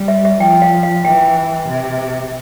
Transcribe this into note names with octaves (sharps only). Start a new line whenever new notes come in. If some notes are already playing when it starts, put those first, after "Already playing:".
Already playing: G3
E5
E5
F3 G5
F5
F5
E3 G5
C3